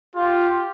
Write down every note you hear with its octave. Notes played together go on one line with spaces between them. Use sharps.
F4 G4